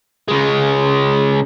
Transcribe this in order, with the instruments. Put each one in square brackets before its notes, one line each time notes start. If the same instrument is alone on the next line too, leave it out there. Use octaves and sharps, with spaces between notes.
[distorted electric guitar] C#3 G#3